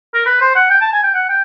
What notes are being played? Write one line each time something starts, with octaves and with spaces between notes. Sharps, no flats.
A#4
B4
C5
F#5
G5
A5
G#5
G5
F#5
G5